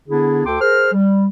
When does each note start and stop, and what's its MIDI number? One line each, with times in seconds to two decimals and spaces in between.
0.09 0.42 50
0.09 0.42 59
0.09 0.42 62
0.09 0.42 64
0.09 0.42 68
0.46 0.59 38
0.46 0.59 69
0.46 0.59 79
0.46 0.59 84
0.46 0.59 86
0.61 0.92 68
0.61 0.92 70
0.61 0.92 72
0.61 0.92 89
0.93 1.27 55